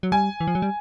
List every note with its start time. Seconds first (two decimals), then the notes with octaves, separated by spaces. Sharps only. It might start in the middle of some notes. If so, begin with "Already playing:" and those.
0.03 F#3
0.12 G3 G#5
0.40 E3
0.47 F3
0.55 F#3
0.62 G3